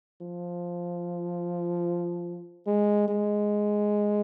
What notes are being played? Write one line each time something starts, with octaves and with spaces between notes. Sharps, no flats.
F3
G#3
G#3